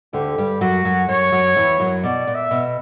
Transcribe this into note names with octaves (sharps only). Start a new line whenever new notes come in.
D2 D3 G4
G2 G3
F#2 F#3 F#4
F#2 F#3
F#2 F#3 C#5
F#2 F#3
E2 E3
F#2 F#3
B2 D5
A#2
E5
B2